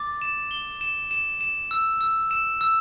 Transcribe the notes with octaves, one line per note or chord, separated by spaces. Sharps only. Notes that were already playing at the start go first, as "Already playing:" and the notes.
Already playing: D6 A6
E7
G7
E7
E7
E7
E6
E6
E7
E6